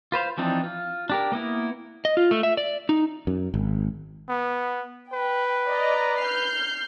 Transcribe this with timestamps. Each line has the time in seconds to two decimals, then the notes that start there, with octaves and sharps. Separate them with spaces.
0.12 F4 B4 C5 F5
0.38 E3 F3 C4 D4 D#4
0.64 F4
1.10 D4 G4 A#4
1.32 A#3 B3 E4 A#4
2.05 D#5
2.17 F4
2.31 A3
2.43 E5
2.57 D5
2.89 D#4
3.27 F#2
3.54 G#1
4.29 B3
5.13 B4 G5
5.68 D5 D#5 A#5
6.22 F6 G6 C7